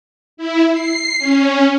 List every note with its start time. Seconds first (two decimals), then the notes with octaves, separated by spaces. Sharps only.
0.37 E4
0.72 C7
1.19 C#4